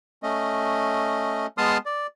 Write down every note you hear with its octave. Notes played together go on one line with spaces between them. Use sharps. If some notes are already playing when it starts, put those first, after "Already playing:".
A3 C#4 D#5
G#3 B3 A5 C6 D#6 F6
D5